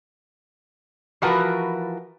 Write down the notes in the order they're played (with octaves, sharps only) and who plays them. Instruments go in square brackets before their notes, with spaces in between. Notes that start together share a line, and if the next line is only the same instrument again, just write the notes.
[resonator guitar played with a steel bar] E3 F3 F#4 A#4 B4